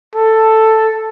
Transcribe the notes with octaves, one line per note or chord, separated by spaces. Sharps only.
A4